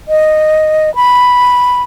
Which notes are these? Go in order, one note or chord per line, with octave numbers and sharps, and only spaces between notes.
D#5
B5